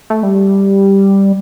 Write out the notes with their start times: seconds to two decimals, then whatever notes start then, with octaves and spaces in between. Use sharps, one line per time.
0.10 A3
0.23 G3